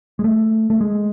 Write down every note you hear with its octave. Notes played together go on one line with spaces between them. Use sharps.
G#3
A3
A3
G#3